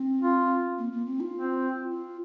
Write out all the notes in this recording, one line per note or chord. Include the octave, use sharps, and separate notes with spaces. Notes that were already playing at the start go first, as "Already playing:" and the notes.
Already playing: C4
F4
A#3
A#3
C4
F4
C4
F4